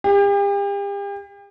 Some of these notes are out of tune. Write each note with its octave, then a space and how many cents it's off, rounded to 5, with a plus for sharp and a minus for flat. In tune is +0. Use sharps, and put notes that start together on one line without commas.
G4 +40